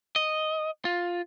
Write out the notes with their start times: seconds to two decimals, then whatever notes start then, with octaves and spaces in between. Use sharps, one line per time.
0.16 D#5
0.85 F4